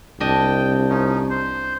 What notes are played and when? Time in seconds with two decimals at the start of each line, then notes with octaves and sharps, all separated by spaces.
0.20 C2 D4 D#5 G5
0.89 F3 C#4 D#4
1.30 C5